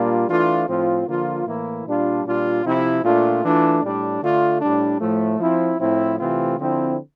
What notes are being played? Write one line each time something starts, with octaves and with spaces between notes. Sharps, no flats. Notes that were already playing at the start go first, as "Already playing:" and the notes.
Already playing: A#2 G3 A#3 D4 F4
E3 A3 D4 F4
A2 F3 C4 F4
D3 F3 A#3 F4
A2 E3 A#3 E4
A#2 G3 D4 F4
A#2 G3 D4 F4
C3 F3 C4 E4
A#2 A3 D4 F4
E3 A3 D4 F4
A2 G3 D4
D3 A3 D4 F4
A2 G3 D4
A2 F3 A3
F3 C4 E4
A2 F3 C4 E4
C3 E3 A3 C4 F4
D3 F3 C4 E4